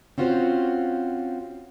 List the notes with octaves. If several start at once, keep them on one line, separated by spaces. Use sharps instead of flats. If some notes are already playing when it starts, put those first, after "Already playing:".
C4 C#4 F4 F#4 C5